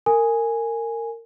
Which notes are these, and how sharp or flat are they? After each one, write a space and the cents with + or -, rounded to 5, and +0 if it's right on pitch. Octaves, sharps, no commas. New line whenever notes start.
A#4 -25 G#5 +0